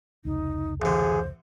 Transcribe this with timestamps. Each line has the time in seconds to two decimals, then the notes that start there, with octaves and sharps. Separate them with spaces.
0.25 F1 C#2 D#4
0.82 A1 D3 G#4 C5